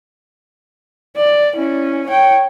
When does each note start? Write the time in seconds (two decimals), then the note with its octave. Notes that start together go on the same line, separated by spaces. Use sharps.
1.16 D5
1.56 C#4 E4
2.07 C#5 G5